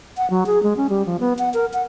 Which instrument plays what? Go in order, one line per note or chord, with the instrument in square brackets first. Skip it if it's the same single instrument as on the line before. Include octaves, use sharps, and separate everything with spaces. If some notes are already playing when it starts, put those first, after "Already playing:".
[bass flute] F#5
F#3
G#4
G#3
C#4
G3
F3
B3
F#5
A#4
F#5